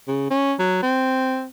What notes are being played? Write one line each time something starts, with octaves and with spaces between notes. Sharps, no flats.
C#3
C#4
F#3
C4